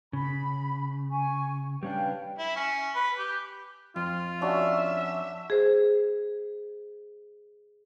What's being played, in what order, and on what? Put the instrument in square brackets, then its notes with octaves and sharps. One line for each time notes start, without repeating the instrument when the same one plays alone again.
[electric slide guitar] C#3 [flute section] B5
[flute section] G#5 C#6
[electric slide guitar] G3 C#4 D4 [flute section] B4 F5 G5
[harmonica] E4
C#4
B4
G4
[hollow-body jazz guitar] F2 [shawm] F4
[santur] C#4 D4 F#4 [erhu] E5
[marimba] G#4 C5